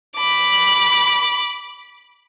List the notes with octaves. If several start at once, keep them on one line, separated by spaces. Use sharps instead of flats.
B5 D6